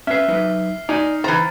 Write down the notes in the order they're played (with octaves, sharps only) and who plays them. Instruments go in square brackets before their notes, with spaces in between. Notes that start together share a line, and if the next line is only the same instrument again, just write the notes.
[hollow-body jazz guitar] C#4 B4 [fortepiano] E5 [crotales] F6 C7
[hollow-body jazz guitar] F#3 D#4 B4
[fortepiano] D#4 [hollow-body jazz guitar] D5 G#5
[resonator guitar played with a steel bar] E3 A#5 [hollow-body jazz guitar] C5 [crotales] A6